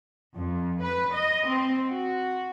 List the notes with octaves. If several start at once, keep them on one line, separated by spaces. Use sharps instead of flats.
F2
B4
D#5
C4
F#4